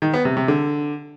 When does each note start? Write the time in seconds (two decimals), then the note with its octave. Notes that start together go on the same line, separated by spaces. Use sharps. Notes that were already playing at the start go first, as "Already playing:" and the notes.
0.02 D#3
0.13 B3
0.25 C3
0.37 C3
0.48 D3